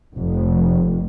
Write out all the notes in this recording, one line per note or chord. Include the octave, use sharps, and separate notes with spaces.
F1 F2